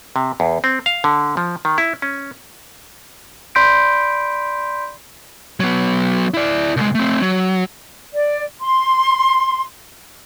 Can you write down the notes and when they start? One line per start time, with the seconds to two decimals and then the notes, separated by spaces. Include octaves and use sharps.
0.16 C3
0.40 E2
0.64 C4
0.86 F5
1.04 D3
1.37 F3
1.65 D#3
1.78 E4
2.02 C#4
3.55 D5 B5 C6 G6 B6 D7
5.60 F#3 B3
6.34 E4 D5
6.77 C2 G#3
6.95 A3 C4
7.22 F#3
8.13 D5
8.62 C6